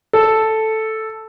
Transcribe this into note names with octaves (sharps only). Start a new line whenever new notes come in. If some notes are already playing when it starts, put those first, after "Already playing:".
A4